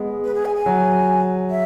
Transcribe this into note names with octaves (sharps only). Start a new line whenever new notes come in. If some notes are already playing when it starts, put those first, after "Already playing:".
Already playing: G#3 B3
B4
G#4
G#5
G#5
F#3
E5